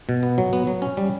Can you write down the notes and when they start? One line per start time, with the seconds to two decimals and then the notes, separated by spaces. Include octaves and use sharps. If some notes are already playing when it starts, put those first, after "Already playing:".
0.09 B2
0.23 B3
0.38 F#3
0.53 B3
0.67 F#3
0.82 C#4
0.97 G3